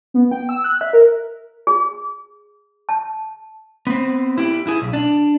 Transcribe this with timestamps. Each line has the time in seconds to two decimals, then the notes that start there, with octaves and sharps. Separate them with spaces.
0.14 B3
0.31 G5
0.49 E6
0.64 F#6
0.81 E5
0.93 A#4
1.67 G#4
2.89 A5
3.87 B3 C4
4.38 E4 G4
4.67 E4 G#4
4.82 B1
4.93 D4